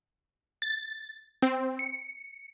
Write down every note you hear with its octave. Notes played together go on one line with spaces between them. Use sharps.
A6
C4
C#7